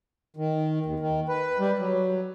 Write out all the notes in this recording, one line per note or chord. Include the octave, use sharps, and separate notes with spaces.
D#3
D#2
D#3
B4
G3
F#3